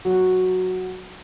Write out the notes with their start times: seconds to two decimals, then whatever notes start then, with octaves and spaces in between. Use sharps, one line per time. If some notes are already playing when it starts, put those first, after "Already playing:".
0.05 F#3